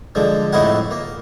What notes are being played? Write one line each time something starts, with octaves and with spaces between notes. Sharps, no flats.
D3 F3 G#3
F2 A2 G#3 D#4 E4 F#5
A#3